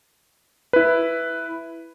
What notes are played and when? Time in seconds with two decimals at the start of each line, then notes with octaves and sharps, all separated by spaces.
0.73 E4 B4